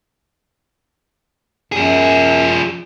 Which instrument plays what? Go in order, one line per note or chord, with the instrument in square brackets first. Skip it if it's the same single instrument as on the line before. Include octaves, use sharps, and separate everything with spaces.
[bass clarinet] F#2 [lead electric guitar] F3 G#4